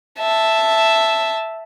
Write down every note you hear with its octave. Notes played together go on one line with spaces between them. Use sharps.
E5 A5